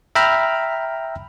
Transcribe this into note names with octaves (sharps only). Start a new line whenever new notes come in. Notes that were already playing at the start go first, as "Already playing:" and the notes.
E5 G5 A#5 B5 E6 F6